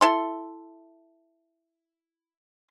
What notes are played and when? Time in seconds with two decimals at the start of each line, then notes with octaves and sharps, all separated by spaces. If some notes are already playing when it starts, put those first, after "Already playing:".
0.01 E4 A4 C6